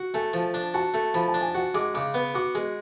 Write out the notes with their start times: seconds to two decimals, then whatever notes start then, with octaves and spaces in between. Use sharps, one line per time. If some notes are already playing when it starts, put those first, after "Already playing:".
Already playing: F#4
0.14 A3 G#5
0.33 F3
0.54 D4
0.74 F#4 A5
0.94 A3
1.14 F3 B5
1.28 A5
1.34 D4
1.41 G#5
1.55 F#4 F#5
1.74 G#3 D6
1.94 C#3 D6
2.14 B3
2.34 F#4 D6
2.55 G#3